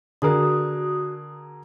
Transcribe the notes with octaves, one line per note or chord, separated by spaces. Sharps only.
D3 F#4 G#4 A#4 D#6